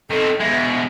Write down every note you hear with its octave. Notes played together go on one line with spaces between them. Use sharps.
D#3 C4 A4
B2 G#3 E5